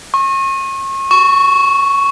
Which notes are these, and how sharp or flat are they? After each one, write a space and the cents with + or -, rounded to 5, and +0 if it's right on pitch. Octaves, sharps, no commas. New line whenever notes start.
C#6 -35
C#6 +5